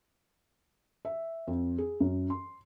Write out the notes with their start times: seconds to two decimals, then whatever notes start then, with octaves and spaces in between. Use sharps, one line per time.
1.05 E5
1.47 F2
1.78 G#4
2.00 F#2
2.30 C6